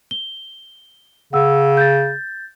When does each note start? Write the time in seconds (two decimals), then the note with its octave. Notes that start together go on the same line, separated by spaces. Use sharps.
0.11 G7
1.33 C#3 F#5 E6
1.77 G6 A6